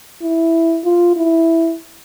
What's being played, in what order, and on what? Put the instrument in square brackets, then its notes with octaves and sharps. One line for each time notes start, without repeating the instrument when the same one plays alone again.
[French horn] E4
F4
E4